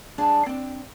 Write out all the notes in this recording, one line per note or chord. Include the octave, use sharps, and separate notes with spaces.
G2 D4 G#4 D5 G#5 A5
C4 D4